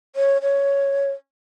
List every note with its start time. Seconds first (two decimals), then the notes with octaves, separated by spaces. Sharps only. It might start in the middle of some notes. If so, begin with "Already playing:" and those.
0.16 C#5
0.42 C#5